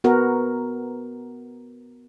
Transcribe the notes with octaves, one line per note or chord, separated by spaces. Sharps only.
B3 F#4 A#4